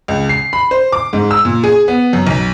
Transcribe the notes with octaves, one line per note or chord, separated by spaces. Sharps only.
C#2
C7
B5
C5
D6
G#2
E6
A#2
G#4
B3
F#2
B1